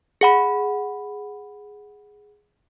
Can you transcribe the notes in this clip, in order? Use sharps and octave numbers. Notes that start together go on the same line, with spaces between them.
G#4 F#5 B5